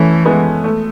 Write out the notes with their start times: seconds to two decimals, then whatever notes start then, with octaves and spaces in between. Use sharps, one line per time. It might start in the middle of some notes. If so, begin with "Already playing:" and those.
Already playing: E3 A3 C#4
0.25 G#3 B3
0.64 A3